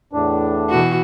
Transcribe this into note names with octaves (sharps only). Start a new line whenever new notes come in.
E2 A2 D4
B2 E3 F#4